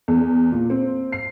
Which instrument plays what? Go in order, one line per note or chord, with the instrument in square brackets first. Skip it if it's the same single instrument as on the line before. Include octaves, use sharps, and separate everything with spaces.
[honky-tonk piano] E2
A#2
C4
C7